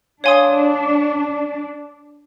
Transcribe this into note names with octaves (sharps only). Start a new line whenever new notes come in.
D4 C#5 F5 G#5 C6 D#6